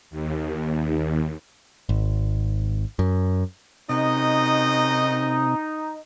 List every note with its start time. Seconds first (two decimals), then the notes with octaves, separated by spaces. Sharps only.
0.11 D#2
1.89 G#1
2.99 F#2
3.89 F#2 C3 D#4 D#5